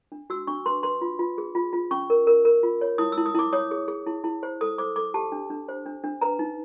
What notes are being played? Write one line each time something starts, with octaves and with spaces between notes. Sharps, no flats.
D4
F#4 E6
D4 C#6
B4 C6
B4 C6
F4
F4
G#4
F4
F4
C#4 C#6
A#4
A#4
A#4
F4
C#5
E4 D#6
E6
E4
D#6
E4 D6
C#5 D#6
G#4
G#4
E4
E4
C5
A4 D#6
C5 D6
A4 D6
G4 A5
D4
D4
C5
D4
D4
B4 A#5
D#4